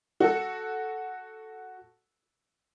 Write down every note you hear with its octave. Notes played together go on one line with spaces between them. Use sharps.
F#4 A4